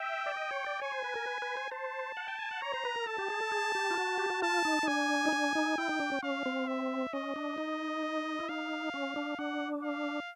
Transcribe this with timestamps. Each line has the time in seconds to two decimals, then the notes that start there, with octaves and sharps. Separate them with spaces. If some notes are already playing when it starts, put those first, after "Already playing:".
Already playing: E5 G5
0.26 D5
0.37 D#5
0.51 C#5
0.66 D5
0.81 C#5 G#5
0.92 C5
1.04 B4
1.15 A#4
1.26 B4
1.42 B4
1.57 C5
1.71 C5 A5
2.17 F#5
2.28 G5
2.39 G#5
2.51 F#5
2.62 C#5 A#5
2.74 C5
2.85 B4
2.96 A#4
3.07 A4 A5
3.18 G4
3.30 G#4
3.41 A4
3.52 G#4
3.75 G4
3.91 F4
3.97 F#4
4.18 G4
4.30 F#4
4.42 F4 A5
4.65 D#4
4.83 D#4
4.87 D4 G#5
5.26 D#4
5.33 D4
5.55 D#4
5.78 E4 G5
5.89 D#4
6.00 D4
6.12 C#4
6.23 C#4 F5
6.46 C4
6.68 E5
7.13 C#4 D#5
7.36 D4
7.58 D#4
8.40 E4
8.49 D#4 F5
8.94 C#4
9.16 D4
9.39 D4 F#5
9.84 F5